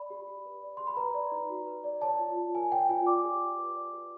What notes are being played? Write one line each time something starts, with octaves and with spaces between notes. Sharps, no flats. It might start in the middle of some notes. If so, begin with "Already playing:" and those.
Already playing: D5 B5
G4
G4
B4
D5
G4 C6
B5
B4 A#5
D5
D#4
F#4
B4
D5
C#5 A5
F4
F4
A#4 G#5
C#5 G5
F4 G#5
D5 D6
G4
G4
B4
D5
G4